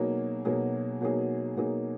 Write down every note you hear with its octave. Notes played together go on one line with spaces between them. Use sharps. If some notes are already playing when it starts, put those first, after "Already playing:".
Already playing: B2 F#3 A#3 D#4 G#4
B2 F#3 A#3 D#4 G#4
B2 F#3 A#3 D#4 G#4
B2 F#3 A#3 D#4 G#4